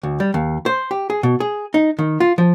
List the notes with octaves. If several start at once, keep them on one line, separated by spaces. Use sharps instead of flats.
D2
G3
D#2
C5
G4
G#4
B2
G#4
D#4
D#3
F4
F3